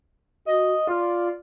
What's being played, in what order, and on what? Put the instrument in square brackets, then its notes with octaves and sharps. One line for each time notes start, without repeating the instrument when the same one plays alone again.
[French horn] F#4 [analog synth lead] D#5
[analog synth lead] F4 [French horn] D5